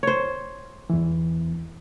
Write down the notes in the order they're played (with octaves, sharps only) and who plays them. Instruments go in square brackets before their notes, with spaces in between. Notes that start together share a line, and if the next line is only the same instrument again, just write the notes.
[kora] C5 C#5
[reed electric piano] E2 E3